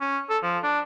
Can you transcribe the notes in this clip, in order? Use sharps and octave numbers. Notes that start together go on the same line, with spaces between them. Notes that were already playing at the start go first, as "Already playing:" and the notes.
C#4
A4
F3
D4